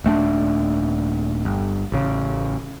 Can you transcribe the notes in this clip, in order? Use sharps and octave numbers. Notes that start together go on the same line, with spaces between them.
D#1 A3 C4 D4
G1
A1 C#3